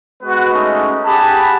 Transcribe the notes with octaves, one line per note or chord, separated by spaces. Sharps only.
G#3 B3 F#4 B4
G#3 A3 C#4 D#4 D#5
G4 G#4 F#5 A5 B5